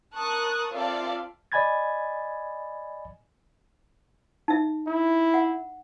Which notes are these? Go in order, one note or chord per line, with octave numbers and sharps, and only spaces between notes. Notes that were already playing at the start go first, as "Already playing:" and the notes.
A#4 A5 C#6 D#6 F#6
C4 F4 A4 D5 E5 F5
D5 D#5 G#5 B5 G#6 A6
D#4 E5
E4
F#5